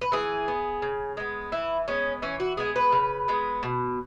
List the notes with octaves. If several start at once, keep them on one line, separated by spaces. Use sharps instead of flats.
B4
E3 G#4
B3
C#3
G#3 B3
E3 E4
G#3 B3 C#4
E3 C#4
F#4
G#3 B3 G#4
B4
C#3
G#3 B3
B2